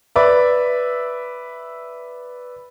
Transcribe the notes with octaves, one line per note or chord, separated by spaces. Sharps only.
B4 D5 E5